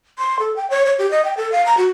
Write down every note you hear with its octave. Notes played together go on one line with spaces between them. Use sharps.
C6
A4
G5
C#5
C#5
G4
D#5
G5
A4
F5
A#5
F#4